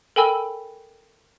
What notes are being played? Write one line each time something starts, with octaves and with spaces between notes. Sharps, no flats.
A4 A#4 G5 G#5 B5 E6